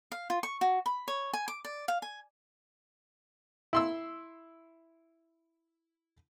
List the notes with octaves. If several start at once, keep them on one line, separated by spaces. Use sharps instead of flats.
F5
F4
C#6
F#4
B5
C#5
G#5
D6
D5
F5
G#5
E4 C6 E6